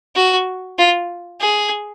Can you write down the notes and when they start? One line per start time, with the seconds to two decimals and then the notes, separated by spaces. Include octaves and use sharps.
0.16 F#4
0.79 F4
1.41 G#4